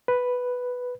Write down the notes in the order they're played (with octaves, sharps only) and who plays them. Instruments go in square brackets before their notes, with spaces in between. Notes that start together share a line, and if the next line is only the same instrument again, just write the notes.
[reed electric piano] B4